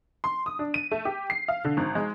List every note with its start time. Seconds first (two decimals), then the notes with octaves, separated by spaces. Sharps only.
0.24 C6
0.46 D#6
0.59 D4
0.74 D#7
0.91 A3
1.05 G4
1.30 C7
1.48 F5
1.65 D3
1.77 G#1
1.95 G#3